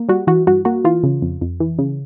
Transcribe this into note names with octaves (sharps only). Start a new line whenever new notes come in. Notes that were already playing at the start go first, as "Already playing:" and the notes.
Already playing: A#3
G3 F#4
E3 F#4
G2 F#4
A#3 F#4
E3 F4
C#3
F2
F2
E3
C#3